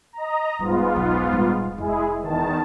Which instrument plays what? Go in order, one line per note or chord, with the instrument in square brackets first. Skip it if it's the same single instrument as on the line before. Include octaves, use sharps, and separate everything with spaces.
[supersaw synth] D#5 A#5
[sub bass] D#1 [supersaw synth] G#2 B3 F4 [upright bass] G3
[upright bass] B1 F#3
A#1 G3
[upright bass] F1 [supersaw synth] G#3 E4 G#4
[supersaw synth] E2 D#3 A5